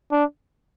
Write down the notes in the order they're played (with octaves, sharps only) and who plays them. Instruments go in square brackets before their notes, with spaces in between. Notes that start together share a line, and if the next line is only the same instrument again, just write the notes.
[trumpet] D4